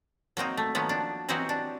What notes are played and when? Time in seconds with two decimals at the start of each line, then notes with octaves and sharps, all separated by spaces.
0.37 F#3 A#3 C4 D#4
0.57 A3
0.75 D#3 F3 F#3 A#3 B3
0.89 D4
1.29 E3 F#3 C4 D#4 F#4 G4
1.49 D4